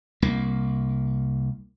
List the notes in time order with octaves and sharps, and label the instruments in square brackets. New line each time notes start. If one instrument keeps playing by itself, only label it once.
[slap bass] C2 A#3